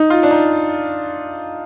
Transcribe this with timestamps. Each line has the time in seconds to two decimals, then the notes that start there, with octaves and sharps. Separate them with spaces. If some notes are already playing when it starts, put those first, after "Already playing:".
Already playing: D#4
0.10 F4
0.23 D4
0.31 D#4